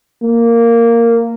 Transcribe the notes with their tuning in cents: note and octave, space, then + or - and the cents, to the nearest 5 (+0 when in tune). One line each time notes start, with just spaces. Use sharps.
A#3 -10